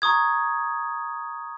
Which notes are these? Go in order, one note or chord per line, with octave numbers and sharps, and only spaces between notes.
A#5 C#6 D#6 G#6